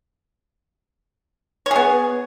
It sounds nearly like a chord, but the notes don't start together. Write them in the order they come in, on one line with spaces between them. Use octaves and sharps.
C#5 G#4 B3